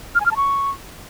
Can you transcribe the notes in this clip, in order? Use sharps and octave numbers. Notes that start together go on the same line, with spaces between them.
F6
G#5
F6
A5
C#6